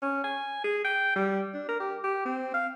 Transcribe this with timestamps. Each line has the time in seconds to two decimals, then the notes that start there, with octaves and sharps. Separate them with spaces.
0.03 C#4
0.24 G#5
0.64 G#4
0.85 G5
1.16 G3
1.54 D4
1.69 A#4
1.80 G4
2.04 G4
2.26 C4
2.54 F5